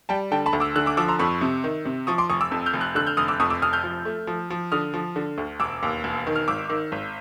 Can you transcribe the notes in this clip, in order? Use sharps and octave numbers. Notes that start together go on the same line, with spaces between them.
G3 G5 A5
D3 G5 A5
A5 B5
D2
D6 E6
D3 E6 F#6
D6 E6
F3 D6 E6
A#5 C6
F2 B5 C#6
C3
D#3
C3
F3 C#6 D#6
C6 D6
F1 C#6 D#6
D6 E6
F2
F6 G6
F1
E6 F#6
D3 E6 F#6
F6 G6
F1 D#6 F6
D6 E6
F2 C#6 D#6
D6 E6
F1 D#6 F6
F6 G6
F3
A3
F3
F3
D3 D#6 F6
F3
D3
D2
E1 D6 E6
D#2
E1
D#3
F6
G#1 D6 E6
D#3
G#1